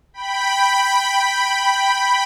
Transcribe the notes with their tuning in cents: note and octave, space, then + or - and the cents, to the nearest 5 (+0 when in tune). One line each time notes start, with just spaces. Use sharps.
G5 +0 B5 +0